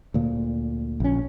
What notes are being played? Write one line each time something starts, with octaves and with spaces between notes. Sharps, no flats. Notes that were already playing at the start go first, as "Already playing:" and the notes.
D2 A#2
A#1 C#4